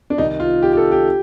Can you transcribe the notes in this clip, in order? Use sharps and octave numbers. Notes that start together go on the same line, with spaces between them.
D4
C2 C3 D#3 D#4
F4
G4
G4
A4
G4